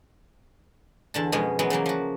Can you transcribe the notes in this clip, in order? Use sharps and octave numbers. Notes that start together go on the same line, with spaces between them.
E2 D3 A5
F2 B2 G#3 B3 C#4
E3 F#3 G#3 B3
C#3 E3 F#3 A#3
F3 F#4